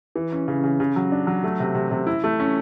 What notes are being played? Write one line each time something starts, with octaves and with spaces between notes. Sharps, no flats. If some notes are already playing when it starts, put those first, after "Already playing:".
E3
C#4
C#3
C#3
C#3
F#3
D4
F#3
A3
C3
C3
C3
E4
A3
C#4